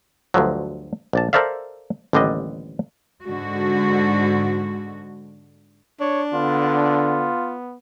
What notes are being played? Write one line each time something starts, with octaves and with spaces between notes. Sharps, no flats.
D2 G2 D3 F3 F#3
A#1 D5 A5
A4 A#4 C5 D5 E5 F5
A1 D#2 D3 G3 D4 D#5
G#2 D3 G#3 F#4
D4 C#5
D3 B3 F4